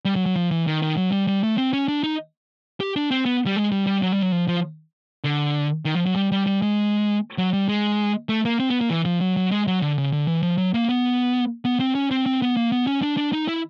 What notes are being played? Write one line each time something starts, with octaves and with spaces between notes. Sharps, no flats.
G3
F#3
F#3
F3
E3
D#3
D#3
F#3
G3
G3
A3
C4
C#4
D4
D#4
G4
D4
C4
B3
G3
G#3
G3
G3
F#3
G3
F#3
F3
F3
D3
D#3
F3
F#3
G3
G3
G3
G#3
F#3
G3
G#3
A3
A#3
C4
B3
A#3
E3
F3
F#3
F#3
G#3
F#3
D3
C#3
D3
E3
F3
F#3
A#3
B3
B3
C4
C#4
C4
C4
B3
A#3
B3
C#4
D4
D4
D#4
E4